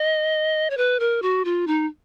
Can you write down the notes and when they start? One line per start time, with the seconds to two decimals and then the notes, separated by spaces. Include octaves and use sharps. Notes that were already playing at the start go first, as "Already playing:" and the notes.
Already playing: D#5
0.70 C#5
0.77 B4
1.00 A#4
1.22 F#4
1.45 F4
1.67 D#4